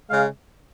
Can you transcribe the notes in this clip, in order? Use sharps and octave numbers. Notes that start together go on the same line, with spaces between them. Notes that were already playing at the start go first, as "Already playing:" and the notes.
C#3 G#3 F5